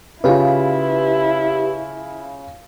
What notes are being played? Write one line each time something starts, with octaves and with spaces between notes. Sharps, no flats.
C#3 E4 F4 G4 B4